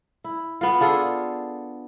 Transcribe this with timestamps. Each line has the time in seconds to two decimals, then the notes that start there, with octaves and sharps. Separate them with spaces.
0.24 E4
0.61 B3 F4
0.81 D4 F4 G#4 A4